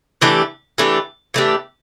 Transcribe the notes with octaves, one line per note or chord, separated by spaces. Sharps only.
E3 A3 D4 G4
E3 A3 D4 G4
E3 A3 D4 G4